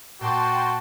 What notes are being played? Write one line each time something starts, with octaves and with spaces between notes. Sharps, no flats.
A#2 F#4 F#5 G5 A5 C6 D6